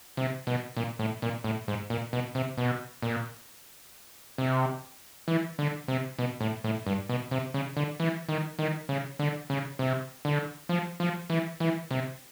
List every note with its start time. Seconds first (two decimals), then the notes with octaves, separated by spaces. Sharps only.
0.17 C3
0.47 B2
0.77 A#2
0.99 A2
1.22 A#2
1.44 A2
1.68 G#2
1.90 A#2
2.13 B2
2.35 C3
2.58 B2
3.02 A#2
4.38 C3
5.28 E3
5.59 D3
5.88 C3
6.19 B2
6.41 A2
6.64 A2
6.87 G2
7.09 B2
7.31 C3
7.54 C#3
7.77 D3
8.00 E3
8.29 D#3
8.59 D#3
8.89 C#3
9.19 D3
9.50 C#3
9.79 C3
10.25 D3
10.69 F3
11.00 F3
11.30 E3
11.60 E3
11.91 C3